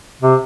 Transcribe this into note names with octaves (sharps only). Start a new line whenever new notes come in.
C3